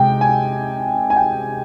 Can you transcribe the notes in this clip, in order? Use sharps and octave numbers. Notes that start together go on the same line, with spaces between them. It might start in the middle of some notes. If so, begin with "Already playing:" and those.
Already playing: C3 G#3 G5
G#5
G#5
G5